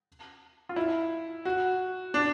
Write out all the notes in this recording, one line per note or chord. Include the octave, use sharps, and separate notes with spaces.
F4
E4
F#4
D4